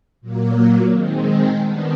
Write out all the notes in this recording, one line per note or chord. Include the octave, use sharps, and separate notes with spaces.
A#2 F#3 A#3
D#3 G#3 C4
D#3 G3 B3 D4